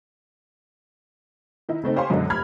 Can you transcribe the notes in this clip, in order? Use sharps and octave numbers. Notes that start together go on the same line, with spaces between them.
D#3 D#4 E4
C#3 A3 C4 D#4
G4 C5 C#5 F5 G#5 C6
F#2 B2 D3 F#3 G#3
F1 B5 F6 G#6